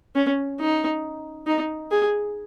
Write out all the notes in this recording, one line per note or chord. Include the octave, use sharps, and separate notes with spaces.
C#4
D#4
D#4
G#4